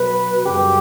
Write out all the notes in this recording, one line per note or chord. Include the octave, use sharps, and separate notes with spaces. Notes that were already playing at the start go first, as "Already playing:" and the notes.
Already playing: B2 F#3 B4
F#2 C#3 G3 G4